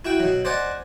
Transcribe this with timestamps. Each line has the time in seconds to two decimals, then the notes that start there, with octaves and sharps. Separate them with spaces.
0.05 E4 F#4 G5
0.20 B2 F#3
0.45 C5 D5 D#5 F#5 G#5